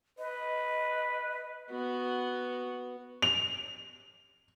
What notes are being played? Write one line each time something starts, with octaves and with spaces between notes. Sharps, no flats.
B4 D#5
B3 F#4
F7